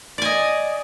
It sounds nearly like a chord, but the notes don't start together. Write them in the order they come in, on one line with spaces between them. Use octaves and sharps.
D5 G#5 D#5